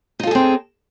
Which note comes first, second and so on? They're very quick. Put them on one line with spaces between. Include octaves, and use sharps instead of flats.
D#4 F4 A4 G#4 C4